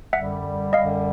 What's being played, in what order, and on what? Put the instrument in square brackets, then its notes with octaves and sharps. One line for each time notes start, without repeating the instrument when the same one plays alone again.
[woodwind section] F#2 D3 G3 [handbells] E5 F#5
[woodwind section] F#2 D3 G3 [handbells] D#5 F5